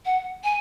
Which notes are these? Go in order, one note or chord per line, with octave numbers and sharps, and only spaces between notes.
F#5
G#5